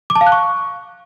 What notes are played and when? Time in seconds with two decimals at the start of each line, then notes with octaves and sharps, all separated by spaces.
0.10 D6
0.15 A5
0.21 F5
0.27 F#6
0.32 C#6